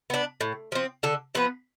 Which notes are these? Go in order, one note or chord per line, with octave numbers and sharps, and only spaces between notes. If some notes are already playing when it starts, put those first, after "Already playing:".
B3 D4
A2
F3 C4
D3 A4
F3 B3 B4